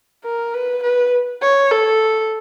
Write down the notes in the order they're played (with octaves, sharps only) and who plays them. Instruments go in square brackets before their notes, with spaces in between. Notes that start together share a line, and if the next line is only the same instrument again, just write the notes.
[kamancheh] A#4
B4
B4
C#5
A4